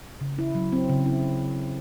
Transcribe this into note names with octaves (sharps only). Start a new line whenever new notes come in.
C#3
E4
F#3
C4
C#3
E4